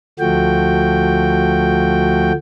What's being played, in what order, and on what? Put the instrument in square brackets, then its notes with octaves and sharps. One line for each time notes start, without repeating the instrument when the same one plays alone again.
[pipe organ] D2 F3 A3 F#4 G5